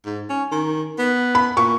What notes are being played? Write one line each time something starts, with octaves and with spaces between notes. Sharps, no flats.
G#2
C#4
D#3
B3
B5
A#2 C#6